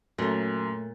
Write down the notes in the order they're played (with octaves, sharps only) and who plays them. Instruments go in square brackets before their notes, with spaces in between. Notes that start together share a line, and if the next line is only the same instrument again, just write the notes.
[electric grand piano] F#2 [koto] A#2 [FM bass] A3